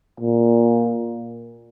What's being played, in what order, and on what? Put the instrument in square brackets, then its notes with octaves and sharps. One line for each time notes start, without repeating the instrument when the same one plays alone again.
[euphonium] A#2